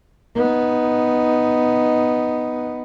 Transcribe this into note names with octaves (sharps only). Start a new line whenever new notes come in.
B3 D#4